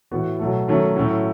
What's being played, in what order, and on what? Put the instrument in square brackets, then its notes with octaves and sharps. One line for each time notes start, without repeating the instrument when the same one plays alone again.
[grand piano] A2 E3 B3 F#4
B2 F#3 A3
D#3 F#3 A3 C#4
A2 F#3 A3 C#4 F#4